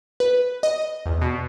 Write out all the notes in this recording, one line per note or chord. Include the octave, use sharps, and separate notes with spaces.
B4
D#5
D#5
E2
B2